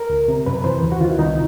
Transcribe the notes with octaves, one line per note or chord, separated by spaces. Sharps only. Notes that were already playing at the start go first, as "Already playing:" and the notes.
Already playing: A#4
C#2
C3
F#2 B4
B4
E3 C5
D#2
F#4
D#3 F4
E4
C2 D#4